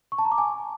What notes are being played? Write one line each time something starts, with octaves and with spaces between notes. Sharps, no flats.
C#6
A5
A#5
D6
G#5